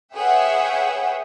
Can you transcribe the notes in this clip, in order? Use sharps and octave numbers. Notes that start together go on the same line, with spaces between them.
G#4 B4 C#5 E5 F#5 G5